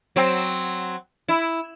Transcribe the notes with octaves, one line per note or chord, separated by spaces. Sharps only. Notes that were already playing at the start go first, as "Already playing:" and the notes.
F#3 C4
E4